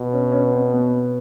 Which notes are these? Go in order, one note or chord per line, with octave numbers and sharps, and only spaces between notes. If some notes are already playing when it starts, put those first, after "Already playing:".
Already playing: B2
C#4
C#4
C4
B3